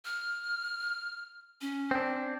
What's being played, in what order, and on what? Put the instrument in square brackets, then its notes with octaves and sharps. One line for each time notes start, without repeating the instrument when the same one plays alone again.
[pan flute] F6
C#4
[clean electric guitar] C4 D4